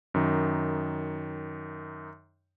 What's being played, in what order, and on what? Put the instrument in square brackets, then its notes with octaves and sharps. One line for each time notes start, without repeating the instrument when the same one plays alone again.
[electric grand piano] F#2 D#3